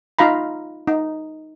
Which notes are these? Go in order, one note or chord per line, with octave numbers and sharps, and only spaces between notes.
D#4 F4 F5 A#5 B5
D#4